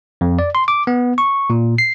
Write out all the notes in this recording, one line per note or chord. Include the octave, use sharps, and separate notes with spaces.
F2
D5
C6
D6
B3
C#6
A#2
C7